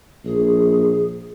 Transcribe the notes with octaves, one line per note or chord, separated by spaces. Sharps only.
A#1 G#4